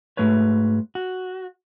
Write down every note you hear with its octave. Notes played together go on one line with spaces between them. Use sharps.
G#2 A3 F#4 B4 C#5
F#4